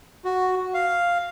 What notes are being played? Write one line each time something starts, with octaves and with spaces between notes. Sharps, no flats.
F#4
F5